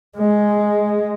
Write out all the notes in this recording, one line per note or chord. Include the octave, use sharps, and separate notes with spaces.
G#3